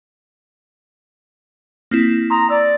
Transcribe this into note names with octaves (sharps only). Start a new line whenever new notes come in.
A#3 C4 E4
A#5 C6 D#6 A#6
D5 E6